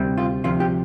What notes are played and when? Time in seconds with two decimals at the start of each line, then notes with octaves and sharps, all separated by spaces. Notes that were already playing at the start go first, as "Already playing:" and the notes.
Already playing: D2 C3 G3 C4
0.17 F4
0.44 D2 C3 F3 F4
0.60 G4